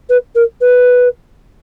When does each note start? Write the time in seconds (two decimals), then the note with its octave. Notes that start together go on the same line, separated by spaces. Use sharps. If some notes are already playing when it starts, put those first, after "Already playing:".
0.09 B4
0.35 A#4
0.61 B4